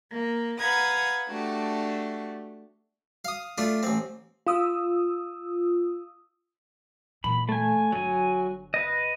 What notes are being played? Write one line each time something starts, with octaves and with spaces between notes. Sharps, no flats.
A#3
B4 F5 F#5 A#5 D#6 G#6
A3 D4 F#4 G4
F5 D#6
A3 D4 F4
A1 C4
F4 D#6 E6
A#2 E3 B5
A3 G#5
G1 F#3 G#5
B4 D#5